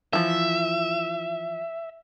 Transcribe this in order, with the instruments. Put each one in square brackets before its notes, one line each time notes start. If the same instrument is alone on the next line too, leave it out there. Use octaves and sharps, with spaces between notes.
[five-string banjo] E3 F3 [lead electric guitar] E5